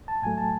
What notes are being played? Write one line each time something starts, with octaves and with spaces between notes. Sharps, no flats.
A5
A2 F#3 A3 G#5
A5